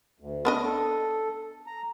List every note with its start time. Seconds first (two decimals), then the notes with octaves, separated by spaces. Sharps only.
0.20 D2
0.45 B3 D4 D#5
0.65 A4
1.67 A#5